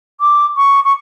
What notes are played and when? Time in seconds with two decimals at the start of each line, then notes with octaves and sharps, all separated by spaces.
0.20 D6
0.56 C#6
0.84 C#6